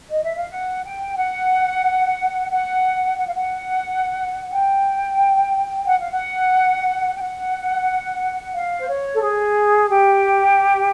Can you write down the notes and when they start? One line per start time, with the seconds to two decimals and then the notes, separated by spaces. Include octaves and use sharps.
0.11 D#5
0.24 E5
0.37 F5
0.50 F#5
0.84 G5
1.17 F#5
2.51 F#5
3.19 F#5
3.27 F5
3.34 F#5
4.53 G5
5.87 F#5
6.00 F5
6.11 F#5
7.17 G5
7.21 F#5
8.55 F5
8.80 C5
8.89 C#5
9.14 A4
9.22 G#4
9.90 G4